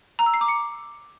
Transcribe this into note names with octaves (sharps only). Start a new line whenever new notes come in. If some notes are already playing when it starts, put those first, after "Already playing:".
A#5
E6
C7
D6
C#7